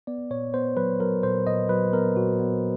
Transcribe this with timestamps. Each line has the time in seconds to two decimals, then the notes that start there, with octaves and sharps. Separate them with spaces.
0.07 B3 D5
0.31 A#2 C#5
0.54 B3 C5
0.77 F#3 B4
1.00 F#3 A#4
1.23 A#2 C5
1.47 A#2 D#5
1.69 F#3 B4
1.93 B3 A#4
2.16 A#2 F#4
2.39 B3